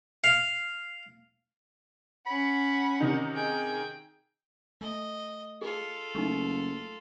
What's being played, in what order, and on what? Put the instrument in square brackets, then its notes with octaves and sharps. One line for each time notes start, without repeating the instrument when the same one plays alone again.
[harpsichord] F5
[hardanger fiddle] C#4 F#5 [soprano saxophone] B5
[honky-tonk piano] C3 D#3 D#4
[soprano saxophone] G#4 [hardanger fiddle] G5
[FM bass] A3 [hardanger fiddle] D#5
[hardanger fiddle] F4 A4 [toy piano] G#4
[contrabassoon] F#1 [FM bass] A3 [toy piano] D#4 C#6